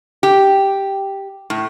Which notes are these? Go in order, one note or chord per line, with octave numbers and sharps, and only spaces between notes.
G4
A2